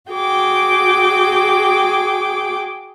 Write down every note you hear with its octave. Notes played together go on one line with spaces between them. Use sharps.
F#4 G#4 G5 D6